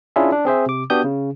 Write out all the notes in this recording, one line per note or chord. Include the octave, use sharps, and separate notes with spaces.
C#4 D4 E4 F4 G#4 E5
D4
C4 G#4 C5 E5
C3 D6
B3 D4 F#4 G4 D#6 G6
C#3